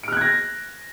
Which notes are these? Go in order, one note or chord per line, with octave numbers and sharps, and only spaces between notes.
F6 F#6 G#6 A#6 D7